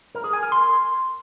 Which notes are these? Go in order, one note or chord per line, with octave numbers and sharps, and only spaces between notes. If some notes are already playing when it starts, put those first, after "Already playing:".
A#4
G#4
G#5
A#4
C6